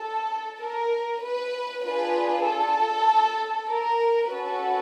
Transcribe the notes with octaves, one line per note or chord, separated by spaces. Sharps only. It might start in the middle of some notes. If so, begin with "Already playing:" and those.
Already playing: A4
A#4
B4
D4 F4 G#4 B4
A4
A#4
C#4 F#4 A4 B4